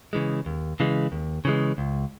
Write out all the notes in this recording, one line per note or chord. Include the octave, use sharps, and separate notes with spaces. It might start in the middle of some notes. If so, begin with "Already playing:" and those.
C#3 E3 G#3
D#2
C#3 E3 G#3
D#2
C#3 E3 G#3
C#2